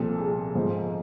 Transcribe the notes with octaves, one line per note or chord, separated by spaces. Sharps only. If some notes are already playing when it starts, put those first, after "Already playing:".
Already playing: C2 A#2 F3 A4
G#4
G#2 F3